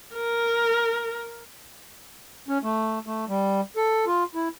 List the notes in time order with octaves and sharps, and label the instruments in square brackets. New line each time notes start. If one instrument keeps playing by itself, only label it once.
[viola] A#4
[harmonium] C#4
A3
A3
G3
A4
F4
E4